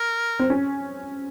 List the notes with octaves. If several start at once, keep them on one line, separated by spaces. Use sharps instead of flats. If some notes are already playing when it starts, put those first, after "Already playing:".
Already playing: A#4
C4
C#4